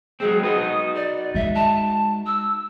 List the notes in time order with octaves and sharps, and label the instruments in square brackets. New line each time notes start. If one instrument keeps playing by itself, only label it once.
[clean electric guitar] F#3 G#3 C4 [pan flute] G#4
[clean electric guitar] D#4 F#4 B4 [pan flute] D#6
[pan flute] D5
[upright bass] G#3 [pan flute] E5
[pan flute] A5
E6